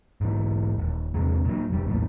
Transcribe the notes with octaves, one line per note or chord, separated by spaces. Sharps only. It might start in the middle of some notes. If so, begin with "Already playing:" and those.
G#2 E3
D#1
E2 C3 G#3
A#2 F#3
F1 G3
A#1 E2 A2